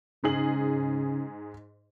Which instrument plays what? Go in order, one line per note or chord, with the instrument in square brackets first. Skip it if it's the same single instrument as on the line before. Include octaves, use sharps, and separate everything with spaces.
[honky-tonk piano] G#2 G#4 F#7 [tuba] C#3